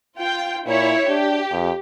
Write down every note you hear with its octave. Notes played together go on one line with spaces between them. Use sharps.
F4 G5
A#2 E4 C#5 E5
D4 G4
F2